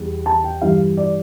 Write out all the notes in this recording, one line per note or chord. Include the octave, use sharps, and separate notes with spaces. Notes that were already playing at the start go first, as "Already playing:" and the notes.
Already playing: E2 G3
A5
G5
G2 E3 G3 F5
D5